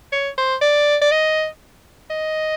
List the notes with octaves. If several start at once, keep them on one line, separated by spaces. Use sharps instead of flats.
C#5
C5
D5
D5
D#5
D#5